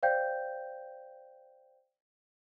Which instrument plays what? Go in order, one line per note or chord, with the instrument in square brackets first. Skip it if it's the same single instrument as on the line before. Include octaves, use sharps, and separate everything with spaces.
[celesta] C5 D5 F5 G5 G6